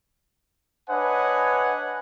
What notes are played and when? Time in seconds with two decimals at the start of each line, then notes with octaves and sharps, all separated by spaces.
0.90 D4 B4 C#5 D#5 F#5 G#5